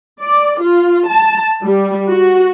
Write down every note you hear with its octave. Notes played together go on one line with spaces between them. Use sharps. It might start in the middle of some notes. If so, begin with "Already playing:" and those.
D5
F4
A5
G3
F#4